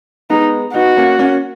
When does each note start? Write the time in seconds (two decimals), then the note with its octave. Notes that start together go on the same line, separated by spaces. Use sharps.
0.30 G#3 B3 D#4
0.74 B3 D#4 F#4
0.97 A#3 C#4
1.19 A#3 C#4